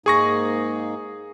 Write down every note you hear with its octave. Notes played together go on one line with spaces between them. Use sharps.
G#2 A#3 D#4 G#4 C#6 A#6